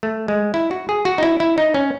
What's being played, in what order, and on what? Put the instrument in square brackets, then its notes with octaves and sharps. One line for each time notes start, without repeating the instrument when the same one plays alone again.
[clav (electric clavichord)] A3
G#3
E4
F#4
G#4
F#4
D#4
E4
E4
D#4
C#4